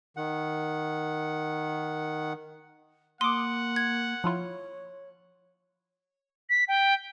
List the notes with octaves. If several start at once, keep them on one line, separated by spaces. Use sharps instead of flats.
D#3 F#5
A#3 F#5 C6 D6 D#6
G#6
F3 E4 F4 C#5
B6
G5